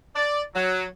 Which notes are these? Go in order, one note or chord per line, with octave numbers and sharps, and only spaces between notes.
D5
F#3